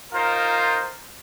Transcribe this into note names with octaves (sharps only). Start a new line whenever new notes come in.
D#4 F4 A#4 C5